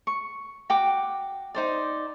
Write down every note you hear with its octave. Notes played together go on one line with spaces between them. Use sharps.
C#6
F#4 G5 D6
D#4 C5 D5